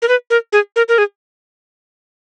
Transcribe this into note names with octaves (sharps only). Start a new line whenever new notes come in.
A#4
B4
A#4
G#4
A#4
A#4
G#4